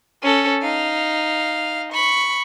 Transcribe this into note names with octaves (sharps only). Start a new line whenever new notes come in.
C#4 A4
D#4 F5
B5 C#6